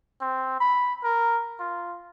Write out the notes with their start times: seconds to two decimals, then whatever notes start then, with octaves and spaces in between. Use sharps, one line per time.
0.21 C4
0.60 B5
1.03 A#4
1.59 F4